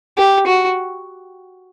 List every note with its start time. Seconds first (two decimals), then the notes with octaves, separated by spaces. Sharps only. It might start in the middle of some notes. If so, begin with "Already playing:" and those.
0.18 G4
0.47 F#4